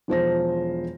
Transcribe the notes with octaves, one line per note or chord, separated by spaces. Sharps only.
E1 F3 C5 A#6